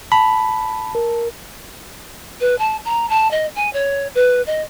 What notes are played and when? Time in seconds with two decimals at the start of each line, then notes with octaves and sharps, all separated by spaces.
0.12 A5 B5
0.95 A#4
2.40 B4
2.58 A5
2.85 A#5
3.09 A5
3.31 D#5
3.55 G#5
3.73 C#5
4.15 B4
4.46 D#5